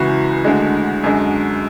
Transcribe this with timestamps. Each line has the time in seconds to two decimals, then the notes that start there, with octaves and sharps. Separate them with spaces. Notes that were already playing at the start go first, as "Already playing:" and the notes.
Already playing: C#2 C#3 E3 F#4
0.44 D2 D3 G#3
1.04 F#2 D3 G#3